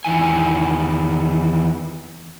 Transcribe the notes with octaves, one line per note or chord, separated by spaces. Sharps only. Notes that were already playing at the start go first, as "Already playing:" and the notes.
E2 D#3 E3 G#5